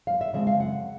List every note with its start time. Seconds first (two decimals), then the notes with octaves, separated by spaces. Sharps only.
0.07 F#2 F5
0.21 E5
0.33 C#3 F3 G#3 C4 E5
0.47 F5
0.60 F#2 F#5